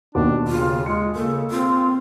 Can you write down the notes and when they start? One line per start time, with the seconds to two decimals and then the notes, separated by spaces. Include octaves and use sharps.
0.15 D#2 B2 D4 D6
0.48 C#3 F4
0.86 G#3 C#7
1.16 C#3 A#3 A4
1.51 C4 F4